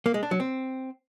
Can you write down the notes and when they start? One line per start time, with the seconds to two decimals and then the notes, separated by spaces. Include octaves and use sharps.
0.06 A#3
0.14 G#3
0.23 D4
0.31 F#3
0.40 C4